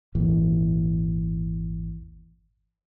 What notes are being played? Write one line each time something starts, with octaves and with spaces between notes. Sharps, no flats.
G#1 E2 A#2 E3